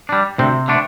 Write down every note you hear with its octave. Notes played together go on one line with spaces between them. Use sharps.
G3 D4
D2 C3 C4
D3 A3 D4